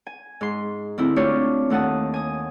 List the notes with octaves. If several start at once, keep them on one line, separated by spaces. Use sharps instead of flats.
G#5
G#2 C6
D2 C4 E4
A3 D4 F4 G4 C#5
D#2 A3 F#5 A5 D#6
G#5 D#6